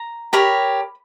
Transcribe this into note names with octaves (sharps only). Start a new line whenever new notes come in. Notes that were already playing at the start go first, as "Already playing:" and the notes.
Already playing: A#5
G4 A#4 C#5 B5